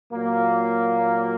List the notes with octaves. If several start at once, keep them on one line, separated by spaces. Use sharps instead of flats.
A#2 F#3 A#3